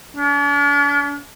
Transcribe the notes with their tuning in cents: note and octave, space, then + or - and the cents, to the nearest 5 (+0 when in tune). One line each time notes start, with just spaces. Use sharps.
D4 -45